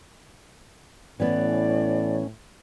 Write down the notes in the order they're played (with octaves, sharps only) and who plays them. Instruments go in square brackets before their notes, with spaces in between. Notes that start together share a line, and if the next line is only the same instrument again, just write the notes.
[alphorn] A2 [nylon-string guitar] E3 B3 [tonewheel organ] C#4 [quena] D5